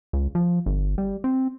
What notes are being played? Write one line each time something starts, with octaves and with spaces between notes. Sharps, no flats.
C#2
F3
G1
G3
C4